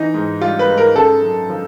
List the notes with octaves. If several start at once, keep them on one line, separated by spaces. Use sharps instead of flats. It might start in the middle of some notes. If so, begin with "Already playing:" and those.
Already playing: E3 D#4
G#2
G3 F4
B4
G#2
A#4
C#3 A4
F#2
F3